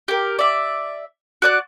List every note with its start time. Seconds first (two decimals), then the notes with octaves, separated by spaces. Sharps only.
0.08 G4 A#4
0.39 D5 E5
1.42 F#4 D5 F#6